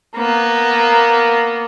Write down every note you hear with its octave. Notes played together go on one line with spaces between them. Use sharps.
A#3 B3